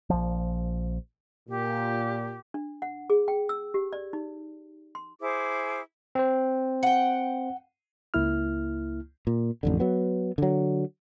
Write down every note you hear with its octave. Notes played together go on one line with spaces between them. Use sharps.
A#1 F3
A#2 G4
D4
F#5
G#4
G5
E6
G4
D5
D#4
C6
E4 G#4 C5 D6
C4 C5
F#5 G5
C#2 A#3 E4 F6
A#2
A1 F2 D3
F#3 B3
D3 F#3